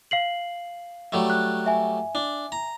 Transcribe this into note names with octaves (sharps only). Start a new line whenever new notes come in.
F5 C7 F#7
F#3 G3 A3
F#6
E5 G#5
D4
A#5